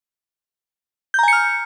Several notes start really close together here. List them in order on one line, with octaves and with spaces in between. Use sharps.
G6 A#5 G#5 C#7 F6